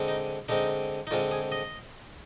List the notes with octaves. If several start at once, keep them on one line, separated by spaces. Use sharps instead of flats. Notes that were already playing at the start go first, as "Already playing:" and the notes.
Already playing: D3 G#3 C4
D#4
D3 G#3 C4 D#4
D#4
D3 G#3 C4 F4
G#4
D#5